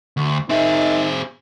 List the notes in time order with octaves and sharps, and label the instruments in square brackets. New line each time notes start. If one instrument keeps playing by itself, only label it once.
[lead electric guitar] D2
[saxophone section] D#3 E5 [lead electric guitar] C4 G#4 [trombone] D#4